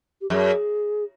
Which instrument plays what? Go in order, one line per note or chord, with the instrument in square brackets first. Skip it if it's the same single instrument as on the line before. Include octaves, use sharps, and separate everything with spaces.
[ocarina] G4
[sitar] F#2 [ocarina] G#4